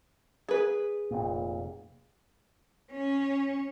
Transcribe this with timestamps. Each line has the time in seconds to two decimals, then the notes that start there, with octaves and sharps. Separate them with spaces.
0.49 G#4 B4
1.11 F1 A#2
2.91 C#4